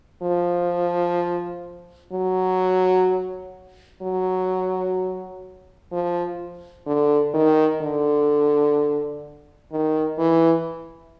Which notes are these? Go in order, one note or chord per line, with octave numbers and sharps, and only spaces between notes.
F3
F#3
F#3
F3
D3
D#3
D3
D#3
E3